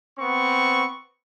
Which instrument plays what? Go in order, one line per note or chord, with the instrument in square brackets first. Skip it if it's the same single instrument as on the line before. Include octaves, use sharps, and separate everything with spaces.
[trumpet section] B3 C4 C#6